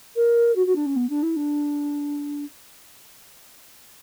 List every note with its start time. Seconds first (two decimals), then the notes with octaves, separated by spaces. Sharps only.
0.15 A#4
0.55 F#4
0.66 F#4
0.75 D4
0.86 C#4
0.96 B3
1.09 D4
1.23 E4
1.36 D4